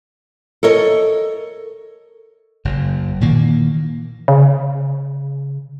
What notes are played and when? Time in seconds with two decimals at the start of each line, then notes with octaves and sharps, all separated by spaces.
0.63 A4 A#4 C#5 D#5
2.65 F#1 F#2
3.21 A#2 D#3 E3 A#3
4.28 C#3